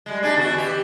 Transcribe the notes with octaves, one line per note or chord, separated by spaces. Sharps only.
G3 G#3
D4 D#4 G#4
E2 E3 F#4
E3 G4